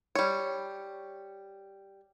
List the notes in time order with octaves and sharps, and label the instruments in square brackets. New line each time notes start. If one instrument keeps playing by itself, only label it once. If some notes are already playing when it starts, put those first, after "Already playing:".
[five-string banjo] G3 C#5